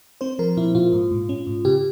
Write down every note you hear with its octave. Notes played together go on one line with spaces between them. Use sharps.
C4 C5
F3 A#4
A#2 E4
A#2 F4
G#2
G#2
C#4
G#2
C#3 G4